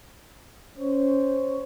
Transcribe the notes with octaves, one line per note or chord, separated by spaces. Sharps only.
C#4 C5 C#5